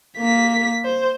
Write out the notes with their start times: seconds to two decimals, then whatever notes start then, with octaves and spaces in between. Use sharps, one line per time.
0.17 A#3 B6
0.85 C5